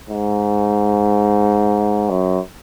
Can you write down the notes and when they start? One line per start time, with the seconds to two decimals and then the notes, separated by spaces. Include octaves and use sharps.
0.10 G#2
2.10 F#2